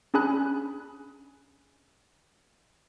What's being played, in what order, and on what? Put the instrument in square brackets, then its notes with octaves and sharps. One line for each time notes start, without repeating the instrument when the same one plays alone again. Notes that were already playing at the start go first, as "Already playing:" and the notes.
[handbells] C#4 D4 G#4 G#5 B5 F#6